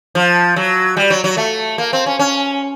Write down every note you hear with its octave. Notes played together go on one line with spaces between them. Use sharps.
F3
F#3
G3
F#3
F#3
A3
A#3
C4
C#4
C#4